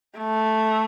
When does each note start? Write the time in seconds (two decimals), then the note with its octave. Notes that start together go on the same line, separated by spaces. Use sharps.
0.18 A3